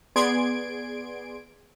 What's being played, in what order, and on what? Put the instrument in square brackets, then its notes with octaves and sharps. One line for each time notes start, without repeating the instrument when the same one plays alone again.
[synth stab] B3 G#4 D5 C6 G#6 D7